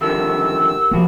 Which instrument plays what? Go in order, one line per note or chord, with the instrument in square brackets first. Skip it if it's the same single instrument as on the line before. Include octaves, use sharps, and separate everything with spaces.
[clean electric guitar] D3 D#3 F3 [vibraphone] G4 A#4 F#5 [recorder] E6
[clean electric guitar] B1 F#4 [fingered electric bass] F3 A#3